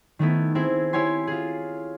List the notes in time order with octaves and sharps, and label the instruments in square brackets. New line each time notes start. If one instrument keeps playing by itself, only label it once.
[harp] D#3 A3 B3 E4
C4 E4 G#4
E4 G4 C#5 G#5 C6
F4 G#4